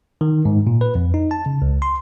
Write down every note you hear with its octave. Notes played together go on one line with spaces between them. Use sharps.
D#3
G#2
A#2
B4
F2
D#4
A5
C#3
C#2
C6